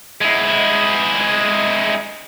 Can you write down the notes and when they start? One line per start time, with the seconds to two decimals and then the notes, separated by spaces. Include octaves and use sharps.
0.21 G#3 E4